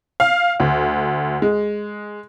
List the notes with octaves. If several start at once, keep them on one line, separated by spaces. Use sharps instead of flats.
F5
D2
G#3